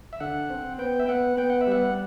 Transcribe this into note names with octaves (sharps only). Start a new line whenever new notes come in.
E5
D3 F#5
C4
B3 G5
E5
B3 F#5
B3 G5
F#5
E5
G3 F#5